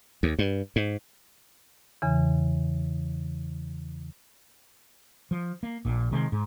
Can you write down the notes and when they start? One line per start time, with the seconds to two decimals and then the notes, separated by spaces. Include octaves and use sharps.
0.23 D#2
0.39 G2
0.76 G#2
2.02 E2 C#3 E3
5.31 F3
5.63 A#3
5.85 A#1 A#2
6.12 C3 D#3 G#3
6.32 G#2